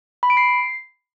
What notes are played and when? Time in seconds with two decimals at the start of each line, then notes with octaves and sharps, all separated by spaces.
0.23 B5
0.30 D7
0.37 C7